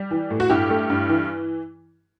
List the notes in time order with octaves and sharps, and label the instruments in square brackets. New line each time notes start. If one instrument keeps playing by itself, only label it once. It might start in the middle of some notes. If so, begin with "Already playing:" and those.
Already playing: [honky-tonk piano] G3
E3
A2
F#4
G2 E4 G4
A3
G2
E3